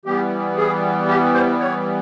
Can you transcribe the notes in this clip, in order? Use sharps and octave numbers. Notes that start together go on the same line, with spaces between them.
E3 G3 B3 G4
G#4
G4
C5
C#5